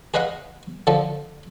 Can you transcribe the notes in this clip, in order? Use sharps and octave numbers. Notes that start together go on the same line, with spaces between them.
G#4 B4 D#5 F5 F#5
D3 F3 A4